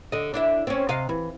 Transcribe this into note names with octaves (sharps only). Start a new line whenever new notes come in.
D3 D#5
D4 E4 E5
C4 C#4
C3 D#5 F5
E3